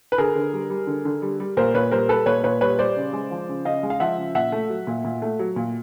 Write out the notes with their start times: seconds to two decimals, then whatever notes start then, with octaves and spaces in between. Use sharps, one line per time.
0.12 B4
0.18 D3 G#4 A#4
0.35 D3
0.53 G3
0.70 G3
0.87 D3
1.05 D3
1.22 G3
1.40 G3
1.57 A#2 A#4 C5
1.74 A#2 B4 C#5
1.92 G3 A#4 C5
2.09 G3 A4 B4
2.26 A#2 B4 C#5
2.44 A#2 B4 C#5
2.61 G3 B4 C#5
2.78 G3 C5 D5
2.96 C#3
3.13 G#3
3.31 F3
3.49 C#3
3.65 C#3 D#5 F5
3.83 G#3
3.90 F5
4.00 F3 E5 F#5
4.18 C#3
4.35 A#2 E5 F#5
4.52 A3
4.70 F#3
4.87 A#2
5.05 A#2
5.22 A3
5.39 F#3
5.56 A#2